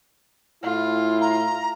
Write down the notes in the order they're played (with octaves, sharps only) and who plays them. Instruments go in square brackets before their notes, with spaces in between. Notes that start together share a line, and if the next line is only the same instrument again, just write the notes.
[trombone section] A2 E4 [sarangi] F4
[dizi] A#5